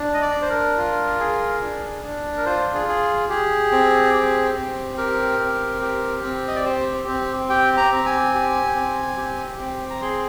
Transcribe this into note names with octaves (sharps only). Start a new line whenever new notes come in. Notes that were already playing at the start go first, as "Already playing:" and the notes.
Already playing: D4
D#5
D5
D4
C5
A#4
F4
G#4
D4
D4
A#4
F4 C5
G#4
G#4
G4 G#4
C4
G4
C4
G4 A#4
C4
G4
C4
D#5
D5
G4 C5
C4
G4 G5
A#5
C4 A#5
G#5
G4
C4
G4
C4
A#5
G#4 C6